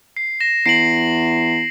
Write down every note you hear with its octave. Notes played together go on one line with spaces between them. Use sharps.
C7
A#6 E7
E2 C7 D7 F#7